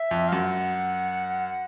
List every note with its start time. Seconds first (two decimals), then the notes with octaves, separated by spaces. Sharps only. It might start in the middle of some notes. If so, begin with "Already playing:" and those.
Already playing: E5
0.11 F2
0.29 F5
0.32 F#2 F#5